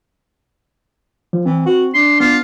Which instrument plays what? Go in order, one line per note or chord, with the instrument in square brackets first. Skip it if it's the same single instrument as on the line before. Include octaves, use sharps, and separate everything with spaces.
[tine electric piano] F3
[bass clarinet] E3 [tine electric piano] C4
[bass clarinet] F#4
[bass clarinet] D4 [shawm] C6
[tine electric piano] B3 [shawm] F4